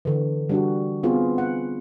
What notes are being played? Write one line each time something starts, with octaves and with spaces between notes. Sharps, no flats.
D3 E3
G3 D4 F#4
B3 C4 F4 G#4
F#5